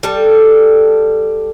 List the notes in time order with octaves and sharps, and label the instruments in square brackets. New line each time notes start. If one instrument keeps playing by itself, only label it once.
[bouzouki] G3 A4